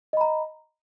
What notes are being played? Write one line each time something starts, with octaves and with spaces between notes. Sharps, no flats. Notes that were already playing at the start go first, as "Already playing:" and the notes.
D#5 A#5 B5